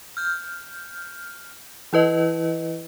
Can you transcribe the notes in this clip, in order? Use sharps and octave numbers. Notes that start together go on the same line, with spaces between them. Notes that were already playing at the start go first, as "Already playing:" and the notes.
F6 G6
E3 E4 B4 D#5